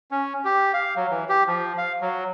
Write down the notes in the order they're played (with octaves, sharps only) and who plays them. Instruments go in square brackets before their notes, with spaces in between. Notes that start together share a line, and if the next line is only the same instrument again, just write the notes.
[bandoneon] C#4
G4
F5
F#3
E3
G4
F3
F5
F#3